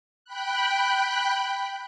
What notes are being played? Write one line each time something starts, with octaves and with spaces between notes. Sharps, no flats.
G5 B5 F#6